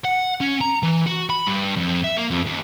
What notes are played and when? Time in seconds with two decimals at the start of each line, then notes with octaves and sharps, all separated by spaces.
0.05 F#5
0.41 C#4
0.61 A#5
0.83 E3
1.07 F#4
1.30 B5
1.47 G2
1.76 F2
2.04 E5
2.17 A#3
2.30 F2
2.46 D#2